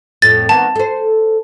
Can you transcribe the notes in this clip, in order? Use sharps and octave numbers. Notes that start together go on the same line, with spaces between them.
F2 A2 A6
D#3 A#3 B3 A5
A4 C5